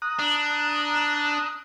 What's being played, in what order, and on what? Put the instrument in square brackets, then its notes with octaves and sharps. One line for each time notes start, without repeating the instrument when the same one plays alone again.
[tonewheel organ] A#5 D#6 F#6
[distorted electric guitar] D4